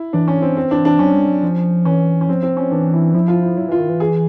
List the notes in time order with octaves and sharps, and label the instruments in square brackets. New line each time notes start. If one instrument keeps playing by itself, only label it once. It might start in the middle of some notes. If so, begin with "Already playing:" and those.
Already playing: [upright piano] E4
[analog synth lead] E3 [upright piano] D4
[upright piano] C#4
C4
C4
D4
D4
[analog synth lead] F#3 [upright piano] C#4
[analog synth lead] G3
F#3
F3
[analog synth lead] E3 [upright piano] C#4
[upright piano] C#4
[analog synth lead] F3 [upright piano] C4
[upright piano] C4
C#4
[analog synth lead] E3 [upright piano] D4
[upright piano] E4
[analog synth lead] F3 [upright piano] E4
[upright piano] F4
E4
[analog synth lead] F#3 [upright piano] E4
[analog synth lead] E3 [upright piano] F4
[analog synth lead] D#3
E3
[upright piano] G#4